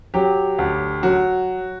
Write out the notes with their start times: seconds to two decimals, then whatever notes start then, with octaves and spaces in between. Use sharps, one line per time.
0.14 F#3 G4
0.58 D2
1.03 F#3 F#4